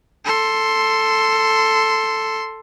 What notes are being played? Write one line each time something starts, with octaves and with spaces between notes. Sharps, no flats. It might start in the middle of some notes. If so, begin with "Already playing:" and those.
A4 C6